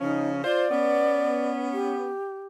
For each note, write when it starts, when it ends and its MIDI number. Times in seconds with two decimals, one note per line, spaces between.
0.01 0.44 49
0.01 0.44 53
0.01 0.44 61
0.01 0.29 63
0.44 0.66 65
0.44 0.66 72
0.44 1.50 74
0.71 2.12 59
0.71 2.12 61
1.72 2.47 67